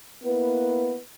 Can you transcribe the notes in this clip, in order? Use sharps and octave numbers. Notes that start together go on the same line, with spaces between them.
A#3 B3 E4 B4